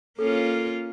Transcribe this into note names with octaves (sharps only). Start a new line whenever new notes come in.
A#3 C#4 F4 A4